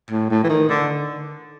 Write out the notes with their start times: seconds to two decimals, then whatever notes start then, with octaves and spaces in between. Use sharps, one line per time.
0.10 A2
0.30 A2
0.44 E3
0.49 D#3
0.69 D3